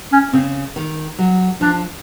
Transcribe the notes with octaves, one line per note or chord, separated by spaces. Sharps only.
C#4
C#3 C4
D#3
F#3
F3 D4